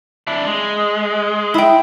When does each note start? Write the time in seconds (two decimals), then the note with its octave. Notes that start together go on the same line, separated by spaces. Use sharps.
0.27 D4 E4
0.47 G#3
1.54 E4 G5